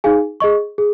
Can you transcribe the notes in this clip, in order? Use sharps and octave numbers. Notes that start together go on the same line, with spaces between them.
D#4 G#4 F5 G#5
G#4 D#5 C#6
G#4